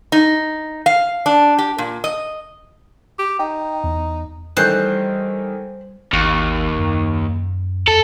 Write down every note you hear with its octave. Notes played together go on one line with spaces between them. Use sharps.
D#4
F5
D4
G4
A#2
D#5
G4
D#4 G5
E2
D#3 E3 G3 A3 C5 F#6
G#1 D#2
F#2
F2 A4